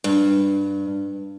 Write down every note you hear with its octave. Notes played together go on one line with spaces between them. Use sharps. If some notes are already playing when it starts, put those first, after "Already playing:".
G2